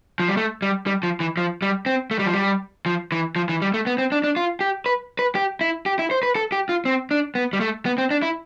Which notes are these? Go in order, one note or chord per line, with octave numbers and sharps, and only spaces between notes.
F3
G3
A3
G3
G3
F3
E3
F3
G3
C4
A3
G3
F3
G3
F3
E3
F3
E3
G3
A3
B3
C4
D4
D4
F4
G4
B4
B4
G4
E4
G4
E4
C5
B4
A4
G4
F4
C4
D4
B3
G3
A3
B3
C4
D4
E4